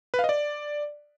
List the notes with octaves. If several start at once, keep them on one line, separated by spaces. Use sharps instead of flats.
B4
F5
D#5
D5